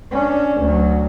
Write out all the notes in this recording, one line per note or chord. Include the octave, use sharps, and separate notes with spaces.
C#4 D4
D2 F#3